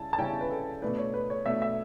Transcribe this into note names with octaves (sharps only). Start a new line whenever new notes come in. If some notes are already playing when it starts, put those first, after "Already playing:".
Already playing: C#3 G3 C#4 E4 A5
A5
C#3 G3 C#4 E4 G5
B4
A4
B2 A3 D4 B4
C#5
B4
C#5
B2 A3 D4 E5
E5